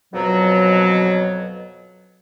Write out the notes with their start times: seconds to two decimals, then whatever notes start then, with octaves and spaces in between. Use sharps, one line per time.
0.13 F2 B2 F#3